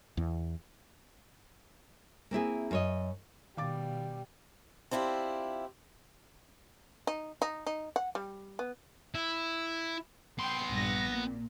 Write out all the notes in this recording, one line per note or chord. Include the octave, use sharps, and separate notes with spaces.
E2
A#3 C4 E4 G#4
F#2 C#5 D#5
B2 D#3 G3 F5 D6 A6
C4 D4 E4 F4 G4
D#4
D#4
D#4
F#5
G3
B3
E4
B3 G5 C6 C7
A#1 G2 A#6
A#2